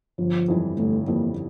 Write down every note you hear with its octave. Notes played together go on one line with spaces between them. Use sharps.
G1 F3
F2 E3 G3
G1 A3
F2 E3 G3 A#3